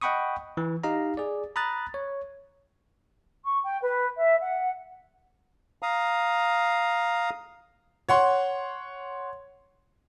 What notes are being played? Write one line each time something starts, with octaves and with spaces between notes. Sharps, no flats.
D#5 F#5 G5 B5 C#6 D#6
E3
D#4 G4 D#5 F5 A#5
G#4 D5
A#5 B5 D#6 F#6 A6
C#5
C#6
G5
B4
E5
F#5
F5 A#5 D#6
C#5 F#5 C6